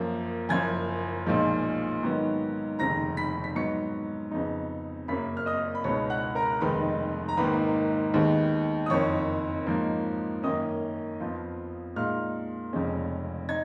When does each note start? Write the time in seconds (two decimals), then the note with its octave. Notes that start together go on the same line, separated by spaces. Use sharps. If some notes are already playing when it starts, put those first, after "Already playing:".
Already playing: F#2 F3 A#3
0.49 F#1 F#2 F3 G#5 G#6
1.26 B1 A#2 F3 G#3
2.03 G#2 D#3 F#3 B3
2.79 F1 D#2 C#3 A#5 A#6
3.17 B5 B6
3.44 B6
3.55 G#2 F#3 B3 D#4 C#6 C#7
4.31 F2 C#3 G#3 B3 D#4
5.08 F#2 C#3 F#3 A#3 B5 B6
5.37 F6
5.46 D#5 D#6
5.75 B5
5.84 C#2 B2 G#3 B3 D#4 C#5 C#6
6.10 F#5 F#6
6.35 A#4 A#5
6.61 F1 D#2 D#3 G#3 D#4 B4 B5
7.29 A#5
7.37 G#1 G#2 D#3 A#3 B4 B5
8.14 D#2 D#3 G#3 B3
8.86 D#6
8.90 F#1 F2 D#3 C#5 C#6
9.67 G#2 F3 A#3 D#4
10.43 F#2 D#3 A#3 C#4 D#5 D#6
11.20 F2 F3 B3 F4
11.96 A#2 G#3 D#4 F5 F6
12.73 F1 F2 C#3 G#3 C#4
13.49 D#4 G#6